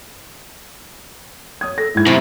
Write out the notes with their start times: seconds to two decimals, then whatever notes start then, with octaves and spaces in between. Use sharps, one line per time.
1.61 C#5 D#6 G#6
1.78 A4 A#6
1.95 G#2 E4 G#6
2.06 F#2 A2 C3 A#5